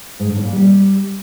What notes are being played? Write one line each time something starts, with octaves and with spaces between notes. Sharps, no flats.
G#2
D3
A2
A#2
G3